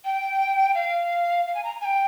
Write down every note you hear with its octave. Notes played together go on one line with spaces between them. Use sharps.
G5
F5
F5
G#5
A#5
G#5
G5